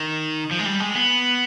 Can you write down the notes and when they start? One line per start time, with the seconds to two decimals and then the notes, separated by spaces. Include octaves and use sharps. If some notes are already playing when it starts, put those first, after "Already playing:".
Already playing: D#3
0.51 F3
0.59 G#3
0.65 G3
0.80 G#3
0.95 B3